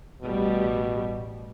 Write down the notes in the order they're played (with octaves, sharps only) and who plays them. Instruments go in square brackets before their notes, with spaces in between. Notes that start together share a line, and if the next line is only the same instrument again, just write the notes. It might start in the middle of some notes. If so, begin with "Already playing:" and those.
[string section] A1 G3 [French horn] B2